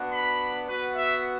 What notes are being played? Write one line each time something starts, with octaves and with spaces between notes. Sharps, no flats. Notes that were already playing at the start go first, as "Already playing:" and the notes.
Already playing: B3 D4 F#4
B5
B3 F#4 B4
E5